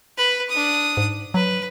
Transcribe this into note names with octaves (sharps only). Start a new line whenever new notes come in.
B4 B5
D4 D#6
G#2
F#3 B4